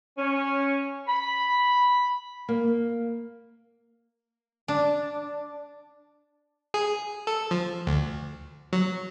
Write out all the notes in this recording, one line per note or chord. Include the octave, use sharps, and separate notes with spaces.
C#4
B5
A#3
D4
G#4
A4
F3
D2
F#3